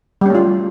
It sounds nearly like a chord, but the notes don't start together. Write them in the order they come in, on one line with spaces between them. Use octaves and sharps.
G3 C#4 A3 F4